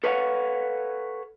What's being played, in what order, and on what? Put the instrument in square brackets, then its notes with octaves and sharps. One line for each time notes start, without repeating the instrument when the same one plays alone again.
[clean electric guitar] A4 B4 C#5 D#5 F5 F#5